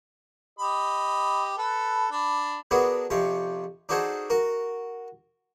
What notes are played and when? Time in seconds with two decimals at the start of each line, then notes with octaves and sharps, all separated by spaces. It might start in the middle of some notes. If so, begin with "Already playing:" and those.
0.59 G4 D#5 B5
1.58 A4 B4
2.11 D4 B5
2.71 B3 D4 F#4 G#4 A#4
3.10 F2 C3 C#4 F5
3.89 D4 D#4 F#4 G#4 A4 C5
4.30 F#4 A#4